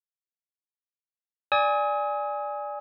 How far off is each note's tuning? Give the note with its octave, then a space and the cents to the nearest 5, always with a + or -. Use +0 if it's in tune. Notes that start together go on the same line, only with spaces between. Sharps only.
D5 +0 G#5 -10 D#6 +40